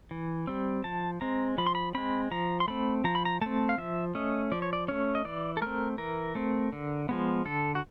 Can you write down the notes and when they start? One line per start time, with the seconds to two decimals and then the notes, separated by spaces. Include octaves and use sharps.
0.11 E3
0.47 G3 C4
0.84 F3 A5
1.21 G#3 C4 A#5
1.58 F3 B5
1.67 C6
1.75 B5
1.95 G#3 C4 B5
2.31 F3 A#5
2.60 C6
2.68 A3 C4 B5
3.04 F3 A#5
3.15 B5
3.25 A#5
3.41 A3 C4 A5
3.69 F5
3.78 F3 E5
4.15 A3 C#4 D#5
4.52 F3 D5
4.62 C#5
4.73 D5
4.88 A3 C#4 C#5
5.15 D#5
5.25 E3 D5
5.57 A4
5.62 A3 C4 A#4
5.98 E3 A#4
6.35 A3 C4
6.73 D3
7.09 F3 G#3 B3
7.45 D3 A4
7.75 F#4